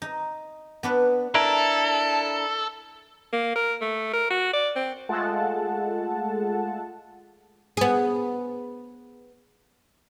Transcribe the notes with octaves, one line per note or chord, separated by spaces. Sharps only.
D#4
B3 D4 B4
D4 E4 A4 A#4
A#3
A#4
A3
A#4
F#4
D5
C4
G#3 A3 F4 A4 F#5 A5
B3 G#4